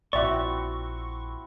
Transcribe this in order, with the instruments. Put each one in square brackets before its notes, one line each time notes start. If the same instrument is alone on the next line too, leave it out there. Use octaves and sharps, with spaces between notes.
[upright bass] A#1 [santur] C4 E4 F#4 [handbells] D5 E5 [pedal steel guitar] C#6